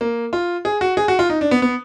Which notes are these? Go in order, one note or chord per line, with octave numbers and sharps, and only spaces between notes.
A#3
F4
G#4
F#4
G#4
F#4
F4
D#4
D4
B3
B3